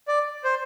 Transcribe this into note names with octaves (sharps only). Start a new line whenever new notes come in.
D5
C5